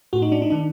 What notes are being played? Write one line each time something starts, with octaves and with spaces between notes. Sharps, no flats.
A2 F#4
D#4
D4
D#4
D#3 D4